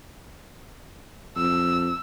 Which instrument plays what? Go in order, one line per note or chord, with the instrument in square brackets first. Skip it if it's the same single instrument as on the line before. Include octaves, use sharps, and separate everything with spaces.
[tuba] F2 [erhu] E6